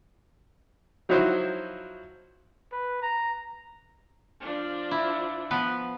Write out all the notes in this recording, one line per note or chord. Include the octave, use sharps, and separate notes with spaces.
F3 F#3 D#4 E4 F#4 C5
B4
A#5
F3 D4
E4
F3 B3 B4